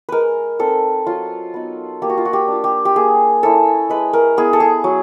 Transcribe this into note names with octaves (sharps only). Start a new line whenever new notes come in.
G#3 A#4 B4
C4 D#4 A4
F#3 F4
B3 D#4
A#3 G4
F#4
F4
F#4
G4
D4 F4
G4
G4
A#3 G#4
C#4 E4 A4
G#3 B4
A#4
B3 E4 G#4
A4
G#4
F#3